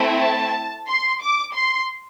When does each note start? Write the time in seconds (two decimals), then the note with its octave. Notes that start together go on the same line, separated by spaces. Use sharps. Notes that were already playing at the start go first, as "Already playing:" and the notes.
Already playing: A3 C4 E4
0.20 A5
0.88 C6
1.21 D6
1.55 C6